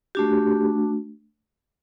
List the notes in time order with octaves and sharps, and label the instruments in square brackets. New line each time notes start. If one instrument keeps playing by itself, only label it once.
[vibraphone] A3 D4 F#4 G4